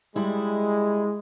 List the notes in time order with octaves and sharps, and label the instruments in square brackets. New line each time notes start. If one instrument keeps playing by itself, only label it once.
[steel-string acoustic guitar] G3 E4 [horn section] G#3